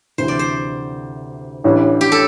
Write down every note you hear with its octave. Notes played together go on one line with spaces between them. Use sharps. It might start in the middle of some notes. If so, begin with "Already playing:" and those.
D2 C3 E3 C5
D5
C5
A1 A2 E3 G3 D4
G4
A4